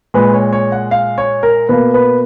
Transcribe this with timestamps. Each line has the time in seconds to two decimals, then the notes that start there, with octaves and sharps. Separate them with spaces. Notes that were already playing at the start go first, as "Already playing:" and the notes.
0.14 A#2 G#3 B4
0.34 C#5
0.53 C#5
0.72 F#5
0.91 F5
1.18 C#5
1.43 A#4
1.69 B2 A#3 B4
1.94 B4